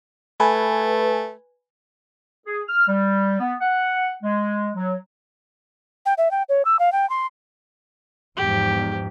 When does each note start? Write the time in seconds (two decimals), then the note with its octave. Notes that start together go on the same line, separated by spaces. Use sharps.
0.40 A3 B4 G#5
2.46 G#4
2.68 F6
2.88 G3
3.40 B3
3.61 F#5
4.23 G#3
4.75 F#3
6.06 G5
6.18 E5
6.31 G5
6.49 C#5
6.65 E6
6.79 F5
6.92 G5
7.10 C6
8.37 E2 G#2 F3 G4